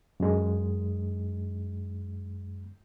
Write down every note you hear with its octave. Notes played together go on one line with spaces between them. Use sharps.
F#2 G#3